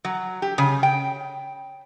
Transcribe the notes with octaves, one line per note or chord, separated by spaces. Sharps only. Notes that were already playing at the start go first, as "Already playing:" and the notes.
F#3
G4
C#3
G5